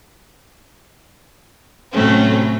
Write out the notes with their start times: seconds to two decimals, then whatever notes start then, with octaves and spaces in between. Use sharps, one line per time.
1.92 A2 C3 F#3 A3 C4 C#4